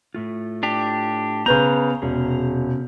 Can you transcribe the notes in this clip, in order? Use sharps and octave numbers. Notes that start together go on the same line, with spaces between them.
A2 A3 F4
D4 G4
C#3 B3 G#4 B4 C5 A#5 G6
E1 C3 C#4 G#4